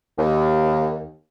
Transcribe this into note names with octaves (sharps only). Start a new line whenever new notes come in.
D#2